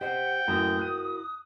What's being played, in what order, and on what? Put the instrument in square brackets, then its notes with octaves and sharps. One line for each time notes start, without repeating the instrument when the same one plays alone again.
[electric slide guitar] G4 C5 [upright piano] D#5 [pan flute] F#5 [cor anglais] G5
[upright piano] F#2 A2 E3 [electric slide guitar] E4 F#4 A#4 [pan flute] D#6
[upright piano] F#6 D#7